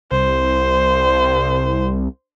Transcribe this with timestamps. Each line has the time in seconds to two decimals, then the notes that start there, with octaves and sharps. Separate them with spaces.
0.12 C2 C5